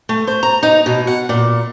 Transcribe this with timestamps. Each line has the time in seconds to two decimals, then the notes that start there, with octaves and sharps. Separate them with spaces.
0.09 A3
0.27 C5
0.43 A#5
0.63 D#4
0.86 B2
1.07 F#5
1.29 A#2